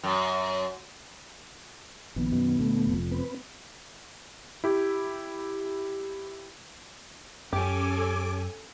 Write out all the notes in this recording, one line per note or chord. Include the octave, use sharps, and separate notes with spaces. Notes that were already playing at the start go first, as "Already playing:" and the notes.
F#2
A#1 D#3 B3
F#2 B2
D2 A#2 A3 B3
F1 F2
C4 B4
E4 G4
F#2 C#4 G4 A4 G#5 D6